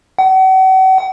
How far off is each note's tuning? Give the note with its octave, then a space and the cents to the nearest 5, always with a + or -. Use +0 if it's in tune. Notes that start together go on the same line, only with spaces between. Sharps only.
F#5 +40